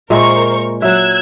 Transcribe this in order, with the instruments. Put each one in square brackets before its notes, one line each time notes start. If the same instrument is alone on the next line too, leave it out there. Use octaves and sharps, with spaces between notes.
[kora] A#2 G#3 E5 [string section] A#4 C5 C#6
[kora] F#3 E5 [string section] E6 F#6 G#6